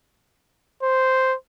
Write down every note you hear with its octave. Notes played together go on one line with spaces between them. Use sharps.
C5